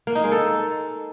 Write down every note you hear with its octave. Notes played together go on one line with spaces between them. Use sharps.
A#3
D#4
G#3
A4